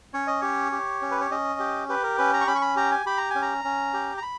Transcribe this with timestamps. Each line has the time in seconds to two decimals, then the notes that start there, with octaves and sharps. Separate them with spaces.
0.14 C#4 C#5
0.27 D#5
0.41 G4 C#5
0.72 G4
1.02 C#4
1.11 B4
1.21 C#5
1.31 C#4 D#5
1.60 G4
1.89 G4 B4
2.03 A#4
2.18 C#4 B4
2.34 A#5
2.41 C#6
2.47 C#4 B5
2.55 C#6
2.62 B5
2.76 G4 A#5
2.92 G#5
3.06 G4 B5
3.17 A#5
3.30 C#4 G#5
3.42 A#5
3.64 C#4
3.94 G4
4.17 A#5
4.23 B5